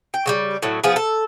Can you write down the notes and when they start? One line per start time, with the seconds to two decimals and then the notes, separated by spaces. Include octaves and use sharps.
0.14 G5
0.26 C#3 F#3 G3
0.63 A2 F#3
0.84 F3 B3 G#4
0.96 A4